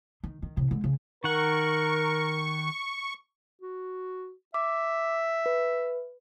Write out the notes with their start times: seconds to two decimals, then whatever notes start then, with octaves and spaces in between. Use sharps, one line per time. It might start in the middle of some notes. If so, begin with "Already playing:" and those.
0.24 D#3
0.43 D#3
0.57 A2 C3
0.71 D3 G#3
0.84 C#3
1.24 D#3 A#4 F#5 C#6
3.61 F#4
4.54 E5 D6
5.46 B4